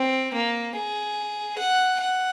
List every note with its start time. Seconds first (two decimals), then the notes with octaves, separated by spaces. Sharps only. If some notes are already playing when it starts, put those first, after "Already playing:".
Already playing: C4
0.34 A#3
0.75 G#4
1.58 F#5
2.00 F#5